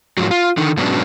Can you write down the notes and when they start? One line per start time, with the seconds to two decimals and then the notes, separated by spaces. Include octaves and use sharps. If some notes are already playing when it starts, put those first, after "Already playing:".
0.17 G#2 F3 F#3
0.31 F4
0.57 D3 D#3
0.77 G#2 B2 F#3 B3 C#4 D4